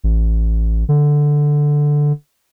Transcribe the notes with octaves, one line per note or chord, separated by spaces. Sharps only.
A1
D3